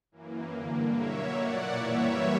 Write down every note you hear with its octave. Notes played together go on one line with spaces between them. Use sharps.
F#2 E3 A#3
G2 D3 A#3
B2 F#3 A#3 C#5 E5
A#2 A#3 D5 F#5
F#2 E3 G3 A#3 C#5 E5